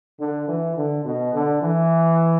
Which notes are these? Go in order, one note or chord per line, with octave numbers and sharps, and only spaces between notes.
D3
E3
D3
B2
D3
E3